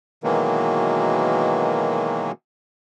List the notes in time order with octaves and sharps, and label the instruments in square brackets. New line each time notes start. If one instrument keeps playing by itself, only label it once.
[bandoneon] B2 D#3 E3 F#3 G#3 A#3